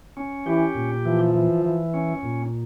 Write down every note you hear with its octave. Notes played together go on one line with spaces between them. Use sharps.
C#4
E3 G4
A#2
E3 F3
E3
E3
C#4
A#2